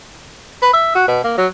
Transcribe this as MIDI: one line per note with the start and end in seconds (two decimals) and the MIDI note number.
0.62 0.72 71
0.73 0.95 76
0.95 1.06 66
1.08 1.20 47
1.24 1.36 58
1.38 1.47 54